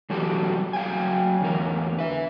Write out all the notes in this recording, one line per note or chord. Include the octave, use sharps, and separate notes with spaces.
E3 F#3 G3 F#4 G4 A4
F#3 F5 G5 G#5
E2 D3 A#4
B4 E5